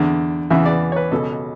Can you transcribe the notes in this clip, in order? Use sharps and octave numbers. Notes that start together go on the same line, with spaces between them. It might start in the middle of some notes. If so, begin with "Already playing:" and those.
Already playing: E2 D3
E2 C#3 E3 E5
D5
C#5
B4
C#2 B2 A4